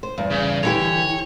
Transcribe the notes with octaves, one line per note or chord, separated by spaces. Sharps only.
C5
E2 G2
C#3
D3 E3 G4 C#5